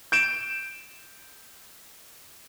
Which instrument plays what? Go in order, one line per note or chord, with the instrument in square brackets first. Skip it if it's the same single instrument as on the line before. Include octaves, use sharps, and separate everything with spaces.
[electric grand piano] G6 D7 E7